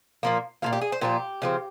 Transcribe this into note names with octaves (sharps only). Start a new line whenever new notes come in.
A#2 F3 A#3
A#2 F3 A#3 F5
G4
G#4
C5
A#2 F3 A#3 G4
C#3 F3 C4